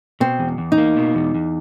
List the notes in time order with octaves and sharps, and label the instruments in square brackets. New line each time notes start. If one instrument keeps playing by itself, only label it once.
[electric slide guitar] B2 [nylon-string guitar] C4
[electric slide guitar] E2
E2
[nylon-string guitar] D#4
[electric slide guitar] A#3
B2
E2
E2